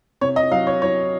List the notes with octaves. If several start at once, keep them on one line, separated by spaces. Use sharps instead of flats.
C3 C#5
D#5
F#3 F5
C#5
F#3 C#5